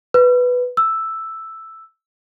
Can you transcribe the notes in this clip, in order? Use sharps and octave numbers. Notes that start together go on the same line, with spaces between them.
B4
E6